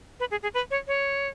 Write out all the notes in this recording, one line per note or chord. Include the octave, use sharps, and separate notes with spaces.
B4
G#4
G#4
B4
C#5
C#5